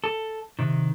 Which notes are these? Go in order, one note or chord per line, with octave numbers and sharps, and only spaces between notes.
A4
C3 D#3